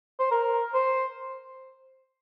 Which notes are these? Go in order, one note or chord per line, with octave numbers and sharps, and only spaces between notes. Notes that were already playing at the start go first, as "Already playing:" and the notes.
C5
A#4
C5